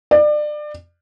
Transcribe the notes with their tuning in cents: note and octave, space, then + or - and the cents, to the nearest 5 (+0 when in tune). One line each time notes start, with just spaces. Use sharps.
D5 +30